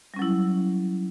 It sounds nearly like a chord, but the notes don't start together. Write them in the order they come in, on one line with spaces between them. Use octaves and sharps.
G3 C#4 F#3 E4